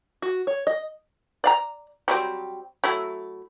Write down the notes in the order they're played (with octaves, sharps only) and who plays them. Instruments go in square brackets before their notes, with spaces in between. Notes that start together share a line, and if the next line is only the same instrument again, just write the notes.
[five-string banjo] F#4
C#5
D#5
[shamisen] D5 F5 A#5
F#3 G3 C4
F#3 A3 E4